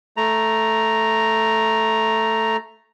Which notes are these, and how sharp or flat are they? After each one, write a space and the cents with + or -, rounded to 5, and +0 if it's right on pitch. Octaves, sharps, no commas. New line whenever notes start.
A3 +0 A#5 +0